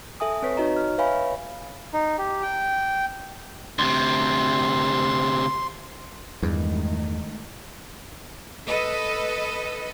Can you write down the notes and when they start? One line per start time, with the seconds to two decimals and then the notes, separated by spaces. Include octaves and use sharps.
0.20 A4 E5 G#5 D#6
0.42 C4 B4 C#5 B6
0.57 D#4 F#4 C#5 D#5 A#5
0.76 F6
0.98 B4 C#5 E5 F5 G#5 B5
1.93 D#4
2.18 G4
2.43 G5
3.79 D2 C3 C6
6.42 E2 G2 D#3 G#3 A3
8.67 A4 B4 D#5